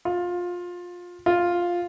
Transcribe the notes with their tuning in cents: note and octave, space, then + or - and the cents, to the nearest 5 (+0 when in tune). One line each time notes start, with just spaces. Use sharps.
F4 +20
F4 +5